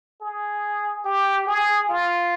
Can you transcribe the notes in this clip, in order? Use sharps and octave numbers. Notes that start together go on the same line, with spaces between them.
G#4
G4
G#4
F4